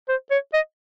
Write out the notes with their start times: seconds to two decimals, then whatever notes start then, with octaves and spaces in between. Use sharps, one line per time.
0.09 C5
0.31 C#5
0.53 D#5